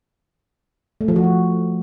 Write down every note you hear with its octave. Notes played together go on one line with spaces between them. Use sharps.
A3
F3
F#4
F3